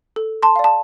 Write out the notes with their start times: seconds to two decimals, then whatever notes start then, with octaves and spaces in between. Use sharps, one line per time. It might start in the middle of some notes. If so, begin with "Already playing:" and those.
0.16 A4
0.43 A5 C6
0.56 D5 F5
0.64 A5